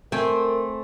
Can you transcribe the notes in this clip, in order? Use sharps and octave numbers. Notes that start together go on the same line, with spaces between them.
A3 C4 A#4 G5 G#5